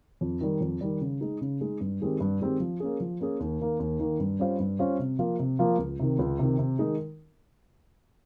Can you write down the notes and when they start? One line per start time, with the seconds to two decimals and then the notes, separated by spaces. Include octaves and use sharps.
0.21 F2
0.41 D#3 G3
0.61 F2
0.81 D#3 G3
1.01 C#3
1.21 G#3 D#4
1.41 C#3
1.61 G#3 D#4
1.80 G2
2.01 D#3 G#3 C4 G4
2.20 G2
2.40 D#3 G#3 C4 G4
2.60 F3
2.80 A#3 C#4 G#4
3.00 F3
3.20 A#3 C#4 G#4
3.40 D#2
3.60 D#3 A#3
3.80 D#2
3.99 D#3 A#3
4.20 G2
4.39 G3 C#4 F4 C5
4.60 G2
4.79 G3 C#4 F4 C5
4.99 C3
5.19 F3 A#3 F4
5.39 C3
5.59 F3 A#3 F4
5.78 C#2
5.99 C3 D#3
6.19 C#2
6.39 C3 D#3
6.59 C3
6.79 D#3 G#3 D#4 A#4